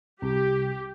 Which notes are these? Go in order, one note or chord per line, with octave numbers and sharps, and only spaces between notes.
C2 G4